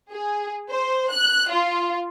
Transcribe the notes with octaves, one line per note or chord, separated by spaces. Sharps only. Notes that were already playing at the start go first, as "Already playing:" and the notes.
G#4
C5
F#6
F4